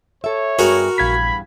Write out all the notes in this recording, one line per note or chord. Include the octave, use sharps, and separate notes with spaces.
A4 C#5 E5
G2 B3 F#4 G#4 A#4 F#5
A#1 E2 G2 F5 B5 G#6 B6